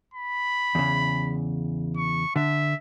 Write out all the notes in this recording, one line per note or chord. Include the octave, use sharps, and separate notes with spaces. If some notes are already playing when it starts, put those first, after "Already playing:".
B5
E2 C#3
C#6
D3 E5